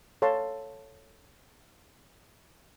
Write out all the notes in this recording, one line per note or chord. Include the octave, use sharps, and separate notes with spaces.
A4 C#5 F5 A5 C6